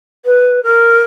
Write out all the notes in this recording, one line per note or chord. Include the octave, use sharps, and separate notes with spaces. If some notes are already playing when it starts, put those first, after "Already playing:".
B4
A#4